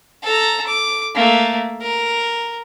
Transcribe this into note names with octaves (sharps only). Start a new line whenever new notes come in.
A4 A#5
D6
A3 A#3
A#4